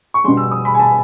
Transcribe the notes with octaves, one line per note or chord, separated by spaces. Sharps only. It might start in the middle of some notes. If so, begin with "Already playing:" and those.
C#6
B2 G3 C6
E6
D#6
B5
G#5
A5